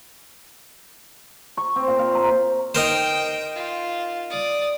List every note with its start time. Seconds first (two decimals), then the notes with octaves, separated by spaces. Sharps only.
1.57 C#6
1.76 C4
1.87 A#2
1.99 F5
2.15 A#5
2.75 D#4 A#4 C5 G5
3.56 F4
4.30 D5 D#6